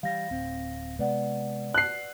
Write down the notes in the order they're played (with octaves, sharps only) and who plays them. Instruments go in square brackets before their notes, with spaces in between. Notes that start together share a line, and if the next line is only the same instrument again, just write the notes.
[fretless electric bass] E3 G3 [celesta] F5 A#6
[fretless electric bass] D1 C4
[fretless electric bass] C3 G#3 B3 [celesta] B4 D5 F#5
[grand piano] F#6 C7